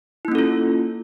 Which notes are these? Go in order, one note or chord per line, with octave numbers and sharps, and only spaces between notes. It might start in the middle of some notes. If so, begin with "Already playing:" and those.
A#3 C#4 E4 F4 A4